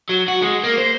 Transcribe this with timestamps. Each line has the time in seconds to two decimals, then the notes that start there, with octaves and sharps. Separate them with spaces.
0.09 F#3
0.28 F#4
0.42 G#3
0.64 A#3
0.78 C5